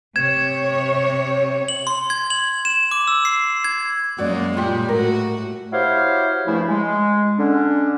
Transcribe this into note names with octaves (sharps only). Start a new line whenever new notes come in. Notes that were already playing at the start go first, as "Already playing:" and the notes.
C3 C#5 G#6 E7
F#7
C6
G#6
F#7
E7
D6
E6
C7
G#6
F#2 G#3 A#3 F#4 D5
A#2 G3 G#3 F4 G4
A2 F#4 A#4
E4 F#4 G4 C5 C#5 F5
G2 C#3 F3 A3 E4
G#3
D3 C#4 D4